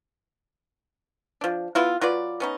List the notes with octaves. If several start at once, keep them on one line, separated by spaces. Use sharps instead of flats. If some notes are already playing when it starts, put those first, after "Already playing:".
F3 D4
B3 E4 F4
F#3 F4 B4 D5
B3 C#4 D#4